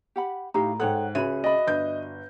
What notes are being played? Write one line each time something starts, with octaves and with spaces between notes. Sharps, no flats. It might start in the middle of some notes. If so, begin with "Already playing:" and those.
G4 F#5 B5
A2 D#4 G4 F5 A#5
G#2 A4 C#5 F#5 G5 F#6
C#2 F#4 G#4 C#5 E5 B5 D#7
D5 D#5 B5
G1 G6